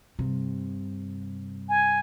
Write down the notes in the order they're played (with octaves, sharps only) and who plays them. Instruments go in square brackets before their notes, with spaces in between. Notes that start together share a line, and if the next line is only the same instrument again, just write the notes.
[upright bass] G2 C3
[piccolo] G#5